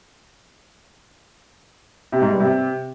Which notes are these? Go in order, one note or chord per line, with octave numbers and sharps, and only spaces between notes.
C3
G#2
G2
C3